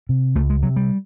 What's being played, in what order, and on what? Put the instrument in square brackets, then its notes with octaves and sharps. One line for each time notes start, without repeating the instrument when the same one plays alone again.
[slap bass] C3
C#2 A3
G#3
C3 F#3
G3